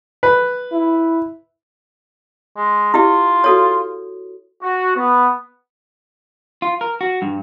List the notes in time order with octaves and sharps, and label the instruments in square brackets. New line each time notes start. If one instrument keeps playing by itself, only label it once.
[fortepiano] B4
[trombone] E4
[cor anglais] G#3
[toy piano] E4 G4 D#5 [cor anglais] F4
[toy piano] F#4 A4 C#5
[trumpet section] F#4
B3
[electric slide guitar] F4
A#4
F#4
G2